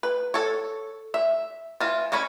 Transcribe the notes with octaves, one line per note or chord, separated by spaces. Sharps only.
B4
A4 C#5
E5
E3 F4
G#3 C#4 C#5 B5